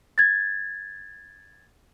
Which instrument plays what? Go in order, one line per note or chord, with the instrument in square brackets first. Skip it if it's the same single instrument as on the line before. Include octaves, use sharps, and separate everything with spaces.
[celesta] G#6 A6